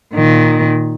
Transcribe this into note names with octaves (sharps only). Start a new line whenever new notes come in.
A#2 D#3